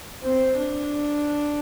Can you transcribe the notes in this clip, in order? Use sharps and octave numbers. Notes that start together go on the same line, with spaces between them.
C4
D4